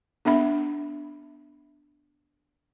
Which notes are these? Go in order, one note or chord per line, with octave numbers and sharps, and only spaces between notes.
B3 D4 E5 B5